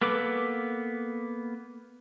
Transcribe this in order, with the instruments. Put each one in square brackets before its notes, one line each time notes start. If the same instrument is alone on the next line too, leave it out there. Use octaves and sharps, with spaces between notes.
[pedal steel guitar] A#3 B3 A4 B4 D6